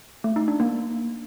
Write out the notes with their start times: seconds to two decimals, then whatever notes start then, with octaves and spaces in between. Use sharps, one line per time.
0.24 A3
0.36 D#4
0.48 D4
0.60 A#3